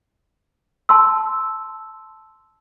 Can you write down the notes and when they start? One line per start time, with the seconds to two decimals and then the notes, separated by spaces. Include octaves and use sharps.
0.89 A5 C6 E6